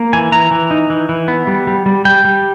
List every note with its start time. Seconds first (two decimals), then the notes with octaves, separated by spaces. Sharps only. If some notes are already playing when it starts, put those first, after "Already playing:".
Already playing: A#3
0.13 E3 G#5
0.32 E3 A#5
0.51 E3
0.71 D#4
0.90 E3
1.09 E3
1.28 B3
1.47 G3
1.67 G3
1.86 G3
2.05 G3 G5
2.25 G3